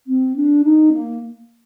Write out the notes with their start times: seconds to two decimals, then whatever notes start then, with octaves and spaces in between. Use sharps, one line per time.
0.07 C4
0.36 D4
0.64 D#4
0.93 A#3